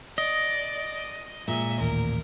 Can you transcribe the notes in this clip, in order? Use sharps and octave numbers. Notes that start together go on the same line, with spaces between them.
D5 D#5
A#2 G#3 E5
A1 D#2 A#4